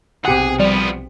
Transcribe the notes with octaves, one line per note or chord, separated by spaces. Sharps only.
B1 C3 G4 G#4 F#5
F3 G3 B3